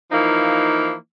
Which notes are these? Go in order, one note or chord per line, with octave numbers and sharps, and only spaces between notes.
E3 F3 A#3 D#4